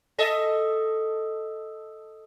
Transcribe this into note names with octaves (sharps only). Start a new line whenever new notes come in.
A4 D#5 E5